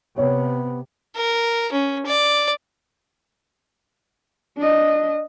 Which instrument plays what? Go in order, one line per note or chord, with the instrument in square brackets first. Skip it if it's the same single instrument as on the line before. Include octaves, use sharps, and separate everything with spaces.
[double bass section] C3 [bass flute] B3 [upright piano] C#5
[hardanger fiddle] A#4
C#4
D5
[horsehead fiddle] D4 D#5